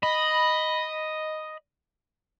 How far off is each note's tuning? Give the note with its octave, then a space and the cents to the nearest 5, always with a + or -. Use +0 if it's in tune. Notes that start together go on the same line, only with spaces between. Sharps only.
D#5 +0 B5 +0